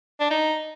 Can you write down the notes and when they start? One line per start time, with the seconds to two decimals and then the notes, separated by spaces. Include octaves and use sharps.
0.20 D4
0.31 D#4